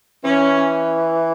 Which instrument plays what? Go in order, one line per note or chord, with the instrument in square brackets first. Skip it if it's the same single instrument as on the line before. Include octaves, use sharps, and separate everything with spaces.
[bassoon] E3 [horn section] C#4